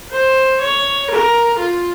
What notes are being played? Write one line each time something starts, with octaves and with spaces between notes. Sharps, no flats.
C5
C#5
A#4
F4